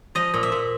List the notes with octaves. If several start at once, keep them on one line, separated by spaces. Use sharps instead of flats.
F3 D#5
A#2
E5
A#2